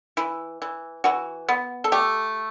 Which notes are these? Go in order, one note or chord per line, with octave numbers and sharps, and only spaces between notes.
E3 E4
E3
E3 F#4
B3
A4
A3 G4